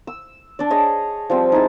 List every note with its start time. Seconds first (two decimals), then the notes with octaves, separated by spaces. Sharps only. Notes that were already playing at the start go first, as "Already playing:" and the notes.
0.07 E6
0.59 D4 D5
0.70 G#4 C#5 D#5
1.30 F3 G3 C4
1.52 D#4 E4 G#4 A5